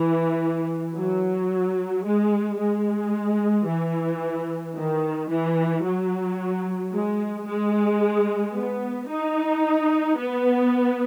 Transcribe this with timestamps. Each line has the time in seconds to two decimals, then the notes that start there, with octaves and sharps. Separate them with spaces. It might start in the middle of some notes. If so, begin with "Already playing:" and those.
Already playing: E3
0.96 F#3
2.05 G#3
2.59 G#3
3.67 E3
4.75 D#3
5.30 E3
5.84 F#3
6.92 G#3
7.46 G#3
8.55 B3
9.08 D#4
10.17 B3